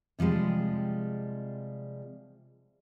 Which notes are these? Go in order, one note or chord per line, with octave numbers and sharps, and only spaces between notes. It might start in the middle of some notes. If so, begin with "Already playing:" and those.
C3 F3 G3 G#3